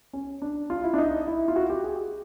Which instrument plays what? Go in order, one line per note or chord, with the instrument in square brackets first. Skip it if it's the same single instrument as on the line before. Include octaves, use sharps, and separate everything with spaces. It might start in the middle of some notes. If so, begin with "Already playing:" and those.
[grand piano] C#4
D4
F4
E4
D4
D#4
E4
F4
F#4
G4
G#4